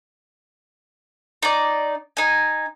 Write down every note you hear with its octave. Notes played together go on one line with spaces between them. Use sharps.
D#4 D5
D#4 G#5